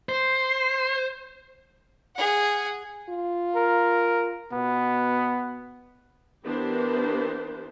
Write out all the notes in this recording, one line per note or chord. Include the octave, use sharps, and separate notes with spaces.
C5
G#4 F#5
F4
A#4
B2 B3
E3 B3 D4 G4 A#4 C5